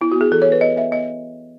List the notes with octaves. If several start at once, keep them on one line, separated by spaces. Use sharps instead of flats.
B3 E4
F#4
B3
G#4
E3 A4
B3 C#5
B4
B3 D#5
B3 E5
B3 D#5